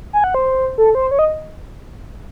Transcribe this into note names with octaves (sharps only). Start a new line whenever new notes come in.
G#5
F#5
C5
A4
C5
C#5
D#5